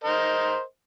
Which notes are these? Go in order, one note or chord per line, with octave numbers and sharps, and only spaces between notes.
A#4 C5 D#5